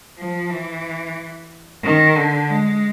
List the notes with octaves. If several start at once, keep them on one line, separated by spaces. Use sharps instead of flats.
F3
E3
D#3
D3
G#3